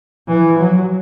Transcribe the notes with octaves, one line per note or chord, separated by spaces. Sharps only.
E3
F#3